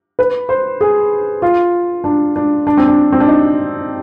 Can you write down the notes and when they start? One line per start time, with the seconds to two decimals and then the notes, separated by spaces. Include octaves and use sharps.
0.19 B4
0.49 C5
0.81 G#4
1.42 F4
2.04 D4
2.36 D4
2.67 D4
2.77 C4
2.88 D4
3.12 C4
3.20 D4
3.27 D#4